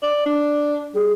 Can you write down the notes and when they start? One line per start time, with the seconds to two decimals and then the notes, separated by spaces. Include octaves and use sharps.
0.02 D5
0.26 D4
0.95 G3 G#4